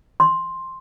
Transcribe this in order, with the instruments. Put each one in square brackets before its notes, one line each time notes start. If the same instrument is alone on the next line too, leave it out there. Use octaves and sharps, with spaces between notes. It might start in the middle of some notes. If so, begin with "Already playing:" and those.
[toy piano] C6